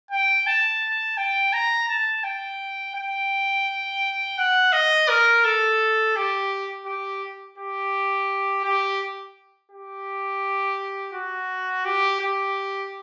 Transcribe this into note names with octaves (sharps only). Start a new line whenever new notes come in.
G5
A5
G5
A#5
A5
G5
G5
F#5
D#5
A#4
A4
G4
G4
G4
G4
G4
F#4
G4
G4